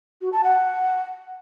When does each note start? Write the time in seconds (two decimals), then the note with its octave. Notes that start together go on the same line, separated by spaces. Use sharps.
0.21 F#4
0.33 A5
0.44 F#5